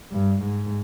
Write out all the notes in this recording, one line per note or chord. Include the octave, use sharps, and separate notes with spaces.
G2
G#2